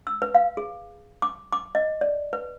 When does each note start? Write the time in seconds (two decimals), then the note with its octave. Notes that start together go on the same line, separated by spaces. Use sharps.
0.07 E6
0.22 B4
0.35 F5
0.57 G#4
1.22 D6
1.53 D6
1.75 D#5
2.01 D5
2.33 B4